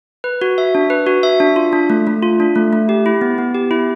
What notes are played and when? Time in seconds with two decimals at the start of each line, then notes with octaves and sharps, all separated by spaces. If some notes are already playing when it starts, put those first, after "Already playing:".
0.24 B4
0.41 F#4
0.58 E5
0.75 D4
0.90 B4
1.07 F#4
1.23 E5
1.40 D4
1.56 F4
1.73 D4
1.90 A3
2.07 A3
2.23 F4
2.40 D4
2.56 A3
2.73 A3
2.89 G4
3.06 E4
3.21 B3
3.38 B3
3.55 G4
3.71 E4